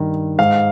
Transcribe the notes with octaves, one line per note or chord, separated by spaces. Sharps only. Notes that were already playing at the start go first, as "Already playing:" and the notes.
Already playing: G2 D#3
G#2 F5